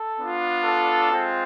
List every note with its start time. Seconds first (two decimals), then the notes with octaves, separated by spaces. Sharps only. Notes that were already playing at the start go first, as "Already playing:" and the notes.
Already playing: A4
0.19 B3 D4 F4
0.65 A4
1.11 G#3 C4 F4